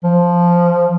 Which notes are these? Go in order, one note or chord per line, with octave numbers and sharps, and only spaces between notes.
F3